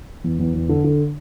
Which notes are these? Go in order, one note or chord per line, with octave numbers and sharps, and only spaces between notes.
E2
E2
E2
D3
D3